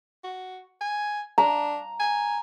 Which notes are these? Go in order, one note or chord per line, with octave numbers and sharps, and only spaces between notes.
F#4
G#5
D4 A#5
G#5